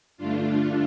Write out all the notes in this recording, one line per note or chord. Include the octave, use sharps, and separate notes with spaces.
G2 D3 A3 D4 F4